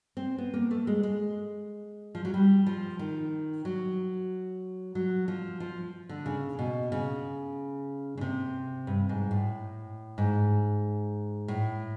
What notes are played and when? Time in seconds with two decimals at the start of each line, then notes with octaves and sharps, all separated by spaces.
0.17 C4
0.38 B3
0.54 A#3
0.71 A3
0.87 G#3
1.03 G#3
2.15 F3
2.25 F#3
2.34 G3
2.66 F3
2.99 D#3
3.65 F#3
4.95 F#3
5.28 F3
5.60 F3
6.09 D3
6.26 C#3
6.59 B2
6.92 C#3
8.17 C#3
8.21 C3
8.87 G2
9.09 G#2
9.31 A2
10.18 G#2
11.48 A2